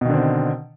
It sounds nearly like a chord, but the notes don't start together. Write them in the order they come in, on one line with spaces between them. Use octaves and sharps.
B2 D#3 D3 C4